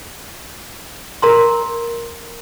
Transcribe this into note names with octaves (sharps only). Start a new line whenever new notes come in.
A#4 A#5 C6